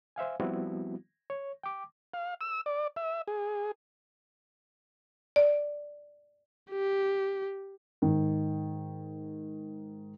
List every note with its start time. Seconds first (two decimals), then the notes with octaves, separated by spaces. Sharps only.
0.16 C5 E5 F5 G#5
0.40 F3 G3 B3 C4 E4 F#4
1.30 C#5
1.63 G5 D6
2.14 F5
2.41 E6
2.66 D5
2.96 E5
3.28 G#4
5.36 D5
6.70 G4
8.02 G#2 D#3